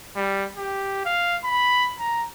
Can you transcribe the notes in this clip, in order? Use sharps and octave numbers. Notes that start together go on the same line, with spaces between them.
G3
G4
F5
B5
A#5